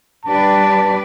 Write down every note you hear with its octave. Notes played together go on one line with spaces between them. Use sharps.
G3 D4 G4 B4 D5 A5